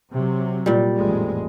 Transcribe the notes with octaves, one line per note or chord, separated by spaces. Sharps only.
C3 F#3
A#2 G3
A1 F2 G#3